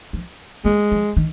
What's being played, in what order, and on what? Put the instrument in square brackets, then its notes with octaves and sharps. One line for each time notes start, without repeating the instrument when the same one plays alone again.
[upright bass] F3
[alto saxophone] G#3 [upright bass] A#3
[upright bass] F3
D#3